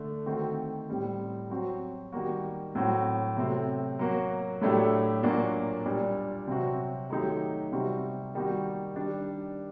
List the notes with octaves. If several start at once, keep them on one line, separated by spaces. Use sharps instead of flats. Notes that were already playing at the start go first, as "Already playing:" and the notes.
Already playing: D3 A3 D4
D#3 A3 C4 F#4
A2 G3 C4
F#3 C4 F#4
D#3 G3 A#3 F#4
A2 F#3 C4 F#4
C3 F#3 A3 C4
F#3 A#3 F#4
A2 F#3 A3 D4 G4
A#2 F#3 A#3 D4 F#4
A#2 G3 D4
C3 F#3 C4 F#4
D#3 F#3 A3 D#4 G4
C3 G3 C4 F#4
D#3 G3 A#3 D#4 F#4
D#3 G3 D4